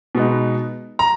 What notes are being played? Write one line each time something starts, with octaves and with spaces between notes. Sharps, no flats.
B2 G#3 B3 D#4
A#5